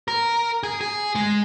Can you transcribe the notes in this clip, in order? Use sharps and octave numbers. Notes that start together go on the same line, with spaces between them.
A#4
G#4
G#4
G#3